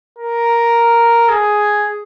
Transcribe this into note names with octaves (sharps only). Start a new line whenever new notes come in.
A#4
G#4